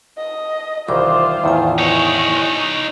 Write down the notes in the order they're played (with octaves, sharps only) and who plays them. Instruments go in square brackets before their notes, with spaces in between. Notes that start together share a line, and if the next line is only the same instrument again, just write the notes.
[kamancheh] D#5
[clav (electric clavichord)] C2 D#3 E3 [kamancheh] F4 C5 [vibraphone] D6
[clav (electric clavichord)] E2 A2 D#3 [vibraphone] E4 G#5
[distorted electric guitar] D#4 C#5 [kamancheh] D#5 C#6